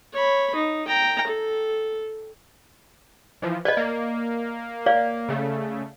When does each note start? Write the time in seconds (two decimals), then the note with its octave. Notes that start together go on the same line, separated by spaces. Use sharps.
0.13 C#5 B5
0.55 D#4
0.87 G5 A#5
1.27 A4
3.42 E3 F3
3.65 B4 D5 D#5
3.77 A#3
4.86 C#5 D5 F5
5.29 C#3 A3